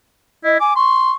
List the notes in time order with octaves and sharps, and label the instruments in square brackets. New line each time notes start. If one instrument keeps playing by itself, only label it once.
[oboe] E4 [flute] D#5
[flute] G#5 [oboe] D6
[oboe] C6 [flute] C#6